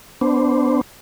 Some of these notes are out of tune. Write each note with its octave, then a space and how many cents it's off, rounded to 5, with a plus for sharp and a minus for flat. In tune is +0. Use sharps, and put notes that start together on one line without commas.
B3 +10 D4 -10 C5 +0